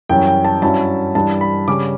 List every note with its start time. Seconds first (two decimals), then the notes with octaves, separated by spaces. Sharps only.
0.09 F#2 E3 G3 C#4 G5
0.27 G5
0.45 A5
0.62 G2 F#3 C#4 E4 A5
1.15 G2 E3 G3 D4 A5
1.41 B5
1.68 C#3 G3 C#4 D6